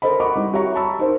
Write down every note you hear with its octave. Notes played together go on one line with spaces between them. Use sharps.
A4 A#4 C5 D#5 B5
D#5 F#5 B5 C#6 D6
G3 C4 E4
F#4 G4 C#5 E5 A#5 C#6
A5 B5 C#6 E6
D#4 A#4 C5